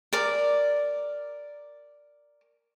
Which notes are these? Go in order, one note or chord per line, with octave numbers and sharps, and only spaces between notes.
A#4 D5